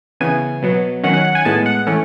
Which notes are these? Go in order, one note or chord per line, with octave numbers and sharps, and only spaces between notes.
C#3 E3 B3 G#5
B2 F#3 B3
D#3 F#3 C#4 F#5
F#5
F#5
G#5
A2 G#3 B3 A5
F#5
E3 A3 C#4